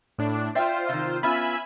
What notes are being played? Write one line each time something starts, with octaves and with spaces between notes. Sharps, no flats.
A2 D4
F4 C5 D5 E5 G5
C3 D#3
B3 C#4 F4 E5 G#5 B5